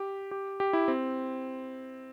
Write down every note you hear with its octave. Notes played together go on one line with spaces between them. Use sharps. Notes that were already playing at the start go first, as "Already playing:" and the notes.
Already playing: G4
G4
G4
E4
C4